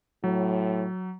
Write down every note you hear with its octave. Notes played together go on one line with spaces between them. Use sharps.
A2 F#3